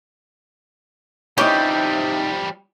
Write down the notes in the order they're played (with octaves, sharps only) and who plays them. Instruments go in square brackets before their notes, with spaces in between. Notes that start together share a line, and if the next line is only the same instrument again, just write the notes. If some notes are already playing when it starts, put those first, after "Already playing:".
[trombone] C3 [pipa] E3 C#4 G4 [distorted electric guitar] F3 G3 [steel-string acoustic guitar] D#4 D5